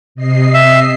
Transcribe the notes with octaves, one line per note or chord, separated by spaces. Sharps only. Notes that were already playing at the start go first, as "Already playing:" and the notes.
C3 D#5 C7
E5